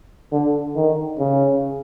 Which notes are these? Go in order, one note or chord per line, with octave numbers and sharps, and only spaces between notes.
D3
D#3
C#3